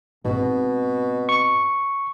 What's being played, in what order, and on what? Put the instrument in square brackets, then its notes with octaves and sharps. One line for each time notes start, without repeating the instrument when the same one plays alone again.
[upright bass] G#2 C4 [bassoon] B2
[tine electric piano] C#6